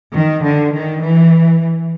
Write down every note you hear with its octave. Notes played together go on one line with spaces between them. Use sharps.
D#3
D3
D#3
E3